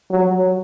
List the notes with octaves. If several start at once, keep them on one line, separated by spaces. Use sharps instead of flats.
F#3